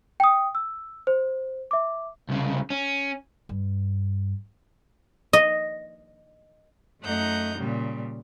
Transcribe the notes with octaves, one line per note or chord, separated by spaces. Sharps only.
G5 D#6
E6
C5
E5 D6
C2 C#3
C#4
G2
D#5
F#2 A3 D#4 F#5 A#5 G6
A#2 C#3 G3